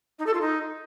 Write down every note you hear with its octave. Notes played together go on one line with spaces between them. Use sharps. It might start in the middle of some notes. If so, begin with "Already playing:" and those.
D#4
A4
F4
D#4